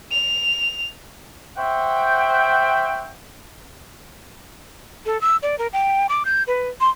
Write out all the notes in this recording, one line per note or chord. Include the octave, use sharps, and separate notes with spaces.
F7
C5 C#5 E5 F#5 G5
A4
E6
D5
A#4
G5
D6
G6
B4
C6